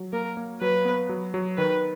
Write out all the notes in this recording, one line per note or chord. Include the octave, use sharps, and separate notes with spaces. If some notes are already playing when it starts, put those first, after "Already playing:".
Already playing: F#3
A#3 A#4
A#3
F#3 B4
B3
F#3
F#3
D#3 B4